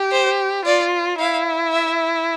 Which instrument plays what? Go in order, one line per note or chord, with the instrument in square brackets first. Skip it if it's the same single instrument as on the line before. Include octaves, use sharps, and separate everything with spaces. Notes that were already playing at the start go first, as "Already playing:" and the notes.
Already playing: [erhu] G4
[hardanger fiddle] C5
[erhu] F4 [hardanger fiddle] D5
[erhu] E4 [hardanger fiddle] F5
[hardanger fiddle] E5